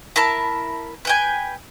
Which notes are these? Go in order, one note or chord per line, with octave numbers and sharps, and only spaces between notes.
E4 A#4 A5 B5
B4 G5 G#5